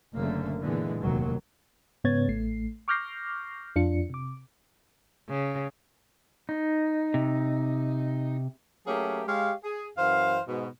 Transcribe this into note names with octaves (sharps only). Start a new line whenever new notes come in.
F#1 F#2 D3 A3 A#3
A#2 D3 E3 G#3 B3
F1 D#2 F#3 A#3
G#2 C#3 B3 C#5 G#6 A6
A1 A3 C7
C#6 D6 F6 G6 A#6 C7
F2 D4 F4 C#7
C3 D6
C#3
D#4
C3
F#3 A3 A#3 C#4 G4 G#4
G#3 G4 C#5 F5
G#4
F#2 E3 C5 F5
G#2 B2